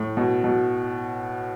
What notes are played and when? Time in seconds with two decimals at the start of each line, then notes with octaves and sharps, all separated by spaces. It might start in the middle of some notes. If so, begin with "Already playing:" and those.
Already playing: A2
0.17 B2
0.44 B2